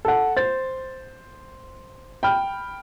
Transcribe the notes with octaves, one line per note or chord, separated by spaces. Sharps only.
A4 F#5
C5 A6
G5 B5 F6